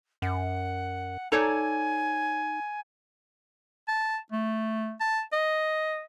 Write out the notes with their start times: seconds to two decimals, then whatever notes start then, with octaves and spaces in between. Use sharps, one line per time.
0.22 F#2 F#5
1.32 D#4 A4 C#5 D5 G#5
3.88 A5
4.32 A3
5.00 A5
5.32 D#5